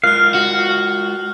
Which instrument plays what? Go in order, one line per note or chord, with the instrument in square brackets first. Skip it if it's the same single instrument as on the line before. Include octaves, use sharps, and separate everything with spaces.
[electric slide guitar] G#3 F4 A#4 [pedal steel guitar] F5 [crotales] F6 F#6
[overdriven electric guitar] F#4